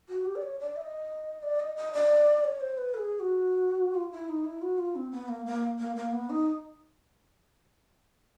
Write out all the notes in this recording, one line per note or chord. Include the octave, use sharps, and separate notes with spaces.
F#4
G4
D5
C#5
D5
E5
D#5
D5
D#5
D#5
D5
C#5
C5
B4
A4
G#4
F#4
F4
E4
D#4
E4
F#4
F4
C4
B3
A#3
A#3
A#3
A#3
B3
D#4